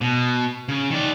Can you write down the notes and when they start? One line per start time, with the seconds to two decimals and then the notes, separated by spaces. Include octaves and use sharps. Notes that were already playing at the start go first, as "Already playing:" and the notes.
0.01 B2
0.68 C#3
0.90 D#3 D5